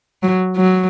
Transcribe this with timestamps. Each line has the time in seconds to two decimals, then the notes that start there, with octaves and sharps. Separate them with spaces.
0.23 F#3
0.57 F#3